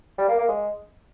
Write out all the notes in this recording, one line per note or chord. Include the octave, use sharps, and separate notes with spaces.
G3
A#3
A#3
G#3